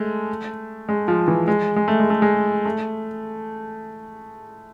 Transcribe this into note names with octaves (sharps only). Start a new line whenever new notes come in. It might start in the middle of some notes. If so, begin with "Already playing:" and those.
Already playing: G#3 A3
G#3
F3
E3
G#3
G#3
A3
G#3
A3
G#3
A3